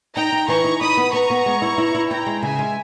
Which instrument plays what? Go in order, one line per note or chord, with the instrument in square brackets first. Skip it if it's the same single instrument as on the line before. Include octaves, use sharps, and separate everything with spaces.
[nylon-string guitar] D#4 [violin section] G5 A#5
[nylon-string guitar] D#4
[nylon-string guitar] E3 [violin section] A#5 C#6
[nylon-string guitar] D#4
[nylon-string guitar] D#4 [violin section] B5 D#6
[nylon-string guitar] B3
[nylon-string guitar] B3 [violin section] A#5 C#6
[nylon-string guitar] B3
G#3
E4
E4
E4
[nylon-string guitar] E4 [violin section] G5 A#5
[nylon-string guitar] G#3
[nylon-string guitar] C#3 [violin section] E5 G#5
[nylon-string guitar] G#3